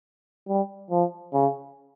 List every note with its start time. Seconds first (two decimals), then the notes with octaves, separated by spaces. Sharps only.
0.48 G3
0.90 F3
1.33 C#3